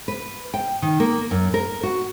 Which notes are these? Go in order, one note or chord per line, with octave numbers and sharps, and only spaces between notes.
B4
G5
D#3
A#3
F#2
A#4
F#4